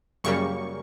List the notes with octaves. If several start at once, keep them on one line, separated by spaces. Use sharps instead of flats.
F#2 C#3 G3 A#3 C#6